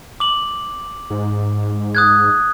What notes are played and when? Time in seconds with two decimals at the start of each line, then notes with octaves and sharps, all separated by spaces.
0.20 D6 F#7
1.10 G#2
1.95 D#6 F#6 G#6